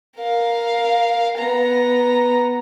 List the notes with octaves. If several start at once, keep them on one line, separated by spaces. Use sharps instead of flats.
A#4 F5
B3 A#5